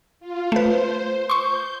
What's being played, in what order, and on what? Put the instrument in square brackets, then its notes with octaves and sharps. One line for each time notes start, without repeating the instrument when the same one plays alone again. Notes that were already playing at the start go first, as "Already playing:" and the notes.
[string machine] F4
[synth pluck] A3 B4 [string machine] C5
[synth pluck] C6 C#6 [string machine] G6